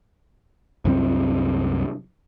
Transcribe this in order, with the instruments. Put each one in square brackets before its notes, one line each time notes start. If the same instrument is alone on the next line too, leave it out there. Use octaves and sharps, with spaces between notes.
[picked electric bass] C2 F#2 G3 C4